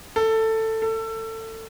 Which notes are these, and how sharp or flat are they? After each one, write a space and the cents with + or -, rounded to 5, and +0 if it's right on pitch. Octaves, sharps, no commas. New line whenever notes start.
A4 +15
A4 +25